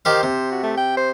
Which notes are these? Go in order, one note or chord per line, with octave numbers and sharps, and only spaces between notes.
D#3 G4 C5 F5
C3
F#4
A3
G5
C5